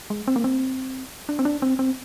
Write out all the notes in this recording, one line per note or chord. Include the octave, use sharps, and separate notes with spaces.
G#3
C4
A#3
C4
D4
C4
D4
C4
C4